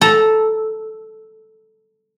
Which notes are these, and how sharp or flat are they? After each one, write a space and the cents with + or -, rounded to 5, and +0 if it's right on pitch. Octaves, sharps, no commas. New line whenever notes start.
A4 -5 A#5 +15